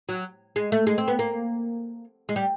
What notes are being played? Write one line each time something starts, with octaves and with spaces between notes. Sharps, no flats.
F#3
G#3
A3
G#3
C4
B3
A#3
G#3
G3